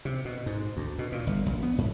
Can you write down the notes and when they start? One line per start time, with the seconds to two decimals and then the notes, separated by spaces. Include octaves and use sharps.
0.05 C3
0.25 B2
0.46 G#2
0.77 D2
0.99 B2
1.12 A#2
1.27 G1
1.46 A#1
1.63 B3
1.78 G#2